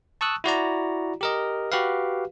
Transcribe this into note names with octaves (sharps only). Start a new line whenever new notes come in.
A5 C#6 D#6 E6 F#6
E4 F#4 D5 A#5
G4 A#4 D#5
F#4 G4 B4 F5